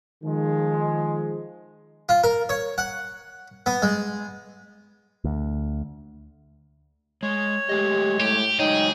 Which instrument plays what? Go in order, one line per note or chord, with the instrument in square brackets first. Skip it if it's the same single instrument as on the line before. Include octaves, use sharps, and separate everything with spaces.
[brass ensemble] D#3 F3 G#3
[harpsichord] F4
A#4
C#5
F#5
B3
G#3
[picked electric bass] D2
[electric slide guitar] G#3 [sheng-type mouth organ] C#5
[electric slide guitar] G#3 A3 D#5 [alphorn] G4
[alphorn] A2 [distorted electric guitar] G4
[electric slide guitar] F#3 G#3 C#5 [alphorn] D#4 [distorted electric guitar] G#4 [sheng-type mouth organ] G5